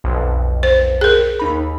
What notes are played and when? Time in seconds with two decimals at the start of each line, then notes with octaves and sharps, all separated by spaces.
0.04 B1 F2
0.63 C5
1.01 G#4 A#4
1.39 D#2 D#4 B5